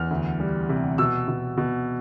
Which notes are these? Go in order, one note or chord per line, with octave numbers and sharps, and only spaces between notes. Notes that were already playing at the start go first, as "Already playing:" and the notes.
Already playing: E2 F6
D2
G3
C3
B2 E6
B2
B2